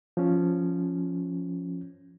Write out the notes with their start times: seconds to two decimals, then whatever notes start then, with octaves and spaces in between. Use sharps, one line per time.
0.17 F3 C#4